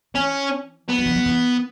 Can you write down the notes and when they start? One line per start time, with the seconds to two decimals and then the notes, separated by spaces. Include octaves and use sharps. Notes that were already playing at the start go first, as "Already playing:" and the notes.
0.15 E3 C#4
0.89 B3
0.98 F#3
1.06 E3
1.15 F#3
1.26 E3